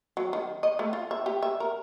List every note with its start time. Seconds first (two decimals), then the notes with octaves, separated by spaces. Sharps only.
0.17 F#3
0.33 D#3
0.63 D#5
0.79 A3
0.93 F4
1.11 E5
1.26 G4
1.43 E5
1.60 A#4